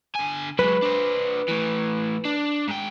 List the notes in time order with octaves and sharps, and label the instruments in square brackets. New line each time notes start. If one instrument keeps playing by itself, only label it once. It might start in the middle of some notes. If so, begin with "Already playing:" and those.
[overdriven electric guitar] D3 G#5
[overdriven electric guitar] F#3 G#3 [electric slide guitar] B4
[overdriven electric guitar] D4 C5
A2 E3
D4
G#2 G5